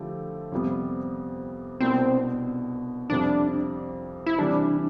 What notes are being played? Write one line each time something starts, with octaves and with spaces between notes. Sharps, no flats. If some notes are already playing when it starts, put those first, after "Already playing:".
Already playing: D3 F3 A3 E4 G4
F2 C3 G3 B3
C2 B2 B3 C4 D4
F2 C3 G3 D4
E4
C3 E3 G3 D4